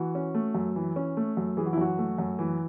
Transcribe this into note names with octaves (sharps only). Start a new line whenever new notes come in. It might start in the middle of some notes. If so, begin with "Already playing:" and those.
Already playing: E3 F#4
C#4
A3
F#2
E3
C#4
A3
F#2
E3 G#4
F#4
E4
F#2 F#4
A3
F#2
E3